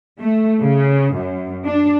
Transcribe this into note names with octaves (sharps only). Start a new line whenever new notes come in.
A3
C#3
F#2
D4